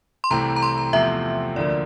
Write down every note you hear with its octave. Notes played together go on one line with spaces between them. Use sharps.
C6
C2 C3 E3 A3 C4 A#5
A#5
C6
A#5
E2 C3 F3 A3 C4 E5
D2 D3 F3 A#3 D5